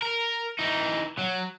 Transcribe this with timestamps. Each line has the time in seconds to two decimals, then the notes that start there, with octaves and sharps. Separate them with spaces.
0.02 A#4
0.59 E3 D#4
1.19 F#3